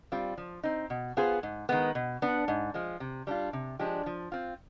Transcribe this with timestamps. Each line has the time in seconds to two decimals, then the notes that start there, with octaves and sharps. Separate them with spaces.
0.12 G3 C4 F4
0.38 F3
0.63 C4 D#4
0.90 B2
1.17 B3 F4 G#4 C5
1.43 G#2
1.69 D#3 G#3 B3
1.95 B2
2.22 B3 D4
2.48 G#2
2.74 F3 G#3
3.00 C3
3.27 G3 D4 F4
3.53 C3
3.79 F3 G#3 D4 G4
4.06 F3
4.32 C4 F4